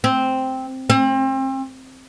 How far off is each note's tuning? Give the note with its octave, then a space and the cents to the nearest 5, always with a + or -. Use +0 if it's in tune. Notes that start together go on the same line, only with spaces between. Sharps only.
C4 +0
C4 +35